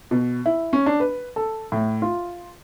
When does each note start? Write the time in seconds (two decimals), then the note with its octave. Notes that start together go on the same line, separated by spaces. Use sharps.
0.11 B2
0.46 E4
0.73 C#4
0.86 D4
1.00 B4
1.36 A4
1.72 A2
2.02 F4